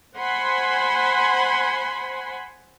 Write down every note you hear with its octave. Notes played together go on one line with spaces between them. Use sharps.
C5 F#5 G#5 B5 C6